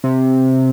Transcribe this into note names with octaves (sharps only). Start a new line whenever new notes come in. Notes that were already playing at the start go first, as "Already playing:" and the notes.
C3